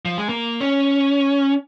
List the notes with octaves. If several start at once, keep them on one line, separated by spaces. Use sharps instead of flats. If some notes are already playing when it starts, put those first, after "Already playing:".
F3
G#3
A#3
C#4